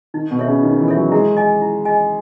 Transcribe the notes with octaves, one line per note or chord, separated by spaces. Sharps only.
D#3 D#4
B2
A4 C#5 E5
C#3
D#3 D#4
E3
A4 C#5 E5
F#3
G#3 E4
G#4 D#5 G#5
E4
G#4 D#5 G#5